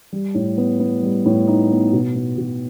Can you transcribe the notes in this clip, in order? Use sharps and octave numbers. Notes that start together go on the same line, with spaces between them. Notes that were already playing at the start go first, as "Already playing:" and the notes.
G3
A2
B3
B3
G3
A2
D#4
B3
B2
B3
B2